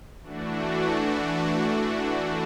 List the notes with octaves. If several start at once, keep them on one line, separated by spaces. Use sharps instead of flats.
E3 A3 D4 F#4